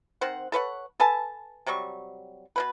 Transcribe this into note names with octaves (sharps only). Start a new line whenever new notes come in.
D#3 C4 C5 F#5
A4 B4 C#5 F#5
A4 B4 G#5 A5
C3 F#3 G3 C#6
B2 A#3 B4